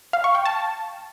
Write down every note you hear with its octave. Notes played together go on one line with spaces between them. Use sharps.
F5
C#6
G5
A5